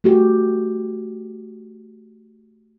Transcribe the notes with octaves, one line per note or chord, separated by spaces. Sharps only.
A3 F#4 G4